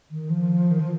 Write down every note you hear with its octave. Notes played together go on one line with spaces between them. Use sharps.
D#3
F3
D#3
F3